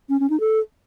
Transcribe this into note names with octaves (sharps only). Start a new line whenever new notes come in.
C#4
C#4
D#4
A4